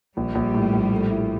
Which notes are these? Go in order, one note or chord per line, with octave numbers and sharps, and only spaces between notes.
A#1 G3
A#1
A2
A#1
A3
E4